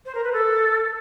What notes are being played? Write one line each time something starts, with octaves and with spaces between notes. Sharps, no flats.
C5
A#4
B4
A4